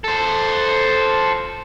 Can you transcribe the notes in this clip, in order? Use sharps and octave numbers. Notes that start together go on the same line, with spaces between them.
A4 C5